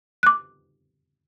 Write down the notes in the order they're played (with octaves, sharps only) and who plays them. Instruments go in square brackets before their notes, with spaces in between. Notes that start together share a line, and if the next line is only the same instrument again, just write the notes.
[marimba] D6 F#6